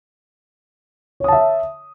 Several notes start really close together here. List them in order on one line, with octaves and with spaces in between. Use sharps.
C#5 D#6 A5 E5